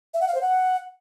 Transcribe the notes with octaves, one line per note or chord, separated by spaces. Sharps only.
E5
F#5
F5
C5
F#5